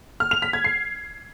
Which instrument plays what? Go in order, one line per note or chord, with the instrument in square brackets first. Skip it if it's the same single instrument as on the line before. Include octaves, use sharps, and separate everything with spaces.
[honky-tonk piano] F6
F7
B6
G#6
C7